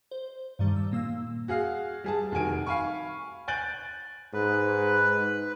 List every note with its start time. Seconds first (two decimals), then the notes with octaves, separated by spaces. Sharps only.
0.11 C5
0.59 G2 D#3 G3
0.76 E6
0.91 A#2 A#3 E6
1.48 F#4 G#4 F5
2.04 G3 G#4 A5
2.32 F1 D#3 F#4 G#5 D7
2.67 F5 G#5 B5 C#6
3.48 G#5 F#6 G6 A6 D7 F#7
4.34 G#2 B4